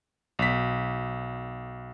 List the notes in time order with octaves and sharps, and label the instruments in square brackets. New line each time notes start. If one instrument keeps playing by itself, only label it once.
[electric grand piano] B1 B6